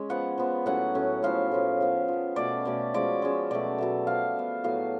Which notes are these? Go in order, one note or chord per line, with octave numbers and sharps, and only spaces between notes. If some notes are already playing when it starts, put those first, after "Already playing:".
Already playing: G#3 C#4
F3 B3 F#5
F3 B3
A2 F#3 C#4 F#5
A2 F#3 C#4
A2 F3 B3 F5
A2 F3 B3
F3 B3
F3 B3
B2 A3 C#4 D5
B2 A3 C#4
F3 G#3 C#4 D5
F3 G#3 C#4
B2 F#3 A3 D5
B2 F#3 A3
F3 B3 F5
F3 B3
A2 F#3 B3 F5